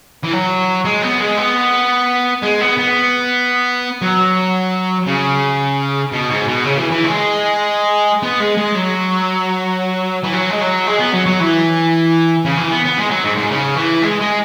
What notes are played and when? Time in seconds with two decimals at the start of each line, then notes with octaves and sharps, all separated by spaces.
0.24 E3
0.32 F#3
0.85 G#3
1.02 B3
1.20 G#3
1.37 B3
2.43 G#3
2.61 B3
2.78 B3
4.02 F#3
5.06 C#3
6.12 B2
6.30 G#2
6.47 B2
6.64 C#3
6.78 E3
6.91 E3
7.04 G#3
8.23 B3
8.40 G#3
8.58 G#3
8.75 F#3
10.24 E3
10.34 F#3
10.50 G#3
10.61 F#3
10.87 G#3
10.99 B3
11.13 F#3
11.26 F#3
11.40 E3
12.45 C#3
12.57 E3
12.71 B3
12.85 B3
12.98 G#3
13.10 F#3
13.24 G#2
13.37 G#2
13.50 C#3
13.76 E3
14.03 G#3
14.20 G#3